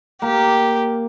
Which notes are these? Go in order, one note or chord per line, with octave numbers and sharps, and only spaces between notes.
A#3 G4